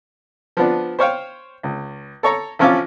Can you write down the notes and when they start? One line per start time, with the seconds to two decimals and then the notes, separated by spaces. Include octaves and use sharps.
0.57 F3 B3 D4
0.99 C5 C#5 F5 G5
1.63 C#2
2.23 A4 C#5 A#5
2.59 A1 F3 C#4 F4 A5 D6